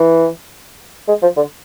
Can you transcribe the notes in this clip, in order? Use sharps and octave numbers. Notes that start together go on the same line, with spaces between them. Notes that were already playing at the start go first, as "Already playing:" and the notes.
Already playing: E3
G#3
F3
D3